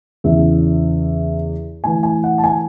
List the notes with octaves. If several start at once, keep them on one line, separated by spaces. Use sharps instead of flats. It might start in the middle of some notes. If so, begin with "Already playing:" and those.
E2 C#3 E3 E5
A2 E3 G#5
G#5
F#5
A5
G#5